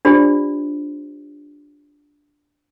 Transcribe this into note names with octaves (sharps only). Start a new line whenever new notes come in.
D4 F4 G4 C5 D5